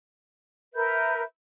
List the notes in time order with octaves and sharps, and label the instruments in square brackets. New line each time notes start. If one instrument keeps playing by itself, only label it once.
[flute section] A#4 B4 E5 G6